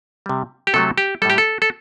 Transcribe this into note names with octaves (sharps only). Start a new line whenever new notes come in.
C3 G3
G4
C3 F#3 A3 A4
G4
A2 G3 G4 A4
A4
A4